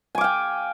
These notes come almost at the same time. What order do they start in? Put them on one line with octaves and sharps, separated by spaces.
G#5 D6 F5 G5